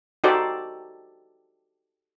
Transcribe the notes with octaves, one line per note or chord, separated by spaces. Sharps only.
D#4 F#4 G4 A4 C5 D5